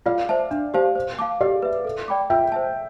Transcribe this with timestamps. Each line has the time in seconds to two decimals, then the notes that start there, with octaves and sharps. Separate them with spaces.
0.06 F4 D5 F5
0.29 C5 E5 A5
0.51 D4
0.74 G4 C5 F5 A5
0.95 C5
1.19 F5 A5 D6
1.41 G4 D5 F5
1.62 B4 E5
1.85 A4
2.08 D5 G5 B5 D6
2.30 F4 E5 G5
2.52 C5 E5 A5